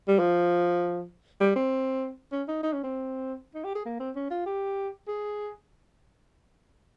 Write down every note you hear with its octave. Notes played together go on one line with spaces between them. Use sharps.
G3
F3
G3
C4
C#4
D#4
D#4
C#4
C4
D#4
G4
G#4
A#3
C4
C#4
F4
G4
G#4